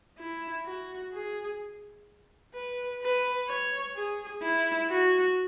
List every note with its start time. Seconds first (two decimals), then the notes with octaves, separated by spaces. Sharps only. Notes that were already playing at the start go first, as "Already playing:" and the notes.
0.19 E4
0.66 F#4
1.13 G#4
2.54 B4
3.02 B4
3.49 C#5
3.96 G#4
4.43 E4
4.90 F#4